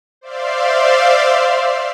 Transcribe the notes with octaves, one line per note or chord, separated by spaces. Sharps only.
C5 D5 E5 F5 C6